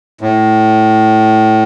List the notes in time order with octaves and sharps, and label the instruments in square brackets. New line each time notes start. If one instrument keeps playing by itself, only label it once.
[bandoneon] A2